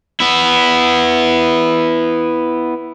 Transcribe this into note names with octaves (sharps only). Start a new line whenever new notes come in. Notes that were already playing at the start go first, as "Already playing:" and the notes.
B3 E4